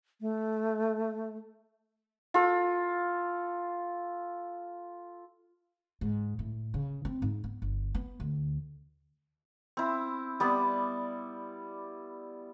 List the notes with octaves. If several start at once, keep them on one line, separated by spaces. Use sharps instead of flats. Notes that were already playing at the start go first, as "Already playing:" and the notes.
A3
F4 A4
G#2
A2
C#3
C4
G#2
B3
G1
B3
D2
C4 E4
G3 B3 D5